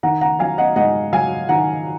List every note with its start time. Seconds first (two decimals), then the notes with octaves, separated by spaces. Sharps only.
0.03 D#3 F#5 A#5
0.21 F#5 A#5
0.39 F#3 F5 G#5
0.58 D#5 F#5
0.76 G#2 D#5 F#5
1.13 F#3 F5 G#5
1.49 D#3 F#5 A#5